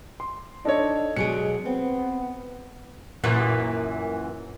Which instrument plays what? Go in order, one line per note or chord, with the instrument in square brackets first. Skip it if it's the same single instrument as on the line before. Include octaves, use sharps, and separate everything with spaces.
[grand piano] C6
[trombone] D4 [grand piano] D#4 A4 C#5
[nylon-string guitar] B2 F#3 G#4 [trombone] G#3 [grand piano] C#7 D7
[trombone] B3 [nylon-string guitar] C4
[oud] F#2 A#2 E3